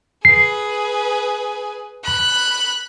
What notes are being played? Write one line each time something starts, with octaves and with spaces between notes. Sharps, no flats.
G#4 B4 C7
B5 F#6